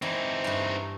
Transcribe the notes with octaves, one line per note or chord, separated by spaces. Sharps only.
E3 C4 D#4
G2 A3